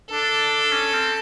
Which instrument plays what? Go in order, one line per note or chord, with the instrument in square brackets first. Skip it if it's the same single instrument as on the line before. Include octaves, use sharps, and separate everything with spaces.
[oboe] D4 [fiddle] A4
[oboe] C#4
C4